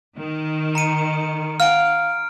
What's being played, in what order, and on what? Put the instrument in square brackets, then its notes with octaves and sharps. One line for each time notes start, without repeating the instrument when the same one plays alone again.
[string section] D#3
[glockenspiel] A#5 C#7 D#7
[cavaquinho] F5 F#5 G#5 [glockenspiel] F6 D7